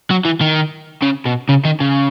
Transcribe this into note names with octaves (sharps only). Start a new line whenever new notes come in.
F#3
E3
D#3
C#3
B2
C#3
D#3
C#3